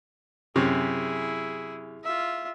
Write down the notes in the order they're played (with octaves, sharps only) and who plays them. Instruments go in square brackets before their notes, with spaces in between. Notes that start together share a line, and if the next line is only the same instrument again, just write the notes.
[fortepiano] F#2 C3 [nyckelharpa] E4 G#4
[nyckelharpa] F4 E5